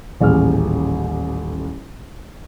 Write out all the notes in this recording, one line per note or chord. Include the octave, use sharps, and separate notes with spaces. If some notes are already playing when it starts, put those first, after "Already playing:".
D#1 A1 G#4 F6